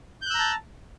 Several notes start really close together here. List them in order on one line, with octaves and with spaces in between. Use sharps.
G6 F#6 E6 A#5 A5